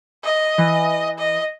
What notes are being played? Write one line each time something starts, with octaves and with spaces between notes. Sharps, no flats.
D#5
E3
D#5